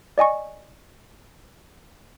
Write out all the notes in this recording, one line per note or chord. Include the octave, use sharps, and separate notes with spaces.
D5 D#5 G#5 C#6